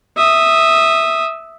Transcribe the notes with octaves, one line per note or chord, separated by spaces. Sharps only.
E5 D#6